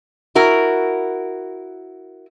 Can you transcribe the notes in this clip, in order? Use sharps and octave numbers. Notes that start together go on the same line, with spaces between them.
E4 F#4 A#4